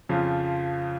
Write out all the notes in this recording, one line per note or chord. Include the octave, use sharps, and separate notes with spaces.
F2 C#3 F3 F4